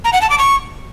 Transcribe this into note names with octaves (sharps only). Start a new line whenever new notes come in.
A#5
F#5
A5
D6
C#6